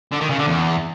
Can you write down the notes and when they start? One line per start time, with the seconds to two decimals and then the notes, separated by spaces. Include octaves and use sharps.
0.12 D3
0.21 D#3
0.30 C#3
0.38 D3
0.47 E2